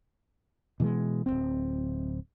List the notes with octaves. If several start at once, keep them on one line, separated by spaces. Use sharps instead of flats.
B2 E3 G3 G#3
D1 G#1 C4